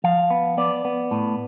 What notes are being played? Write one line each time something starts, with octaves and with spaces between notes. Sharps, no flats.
F3 F5
B3
B3 D5
B3
A2